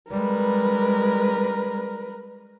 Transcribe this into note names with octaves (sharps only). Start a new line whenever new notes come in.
G3 G#3 A#4 B4